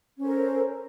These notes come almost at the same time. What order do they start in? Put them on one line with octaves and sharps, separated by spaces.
C#4 C5 A4 A#4